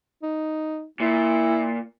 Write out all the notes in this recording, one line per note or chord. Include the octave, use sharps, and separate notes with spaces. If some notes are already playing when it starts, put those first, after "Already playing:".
D#4
A#2 E4